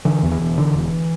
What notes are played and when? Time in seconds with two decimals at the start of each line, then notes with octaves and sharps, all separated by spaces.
0.05 D3 E3
0.23 E2
0.31 E3
0.39 E1
0.58 D3
0.74 E1